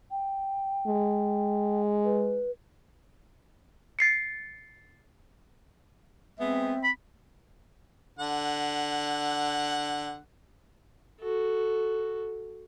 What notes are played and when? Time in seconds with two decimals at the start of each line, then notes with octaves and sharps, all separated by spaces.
0.11 G5
0.87 G#3
2.05 B4
3.99 A6 C7 C#7
6.39 G#3 B3 C4 E5
6.84 B5
8.19 D3 F#5
11.20 F#4 A4